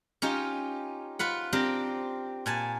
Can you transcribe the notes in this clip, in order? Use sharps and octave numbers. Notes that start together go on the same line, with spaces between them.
C#4 D#4 F4 G4
F4 B4 F#5
C4 D4 G4 A#4
A#2 G#5 A5